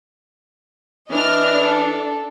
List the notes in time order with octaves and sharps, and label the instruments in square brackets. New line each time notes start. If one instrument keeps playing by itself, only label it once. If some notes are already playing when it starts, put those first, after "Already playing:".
[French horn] E3 [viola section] D4 [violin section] D#5 F6
[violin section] A4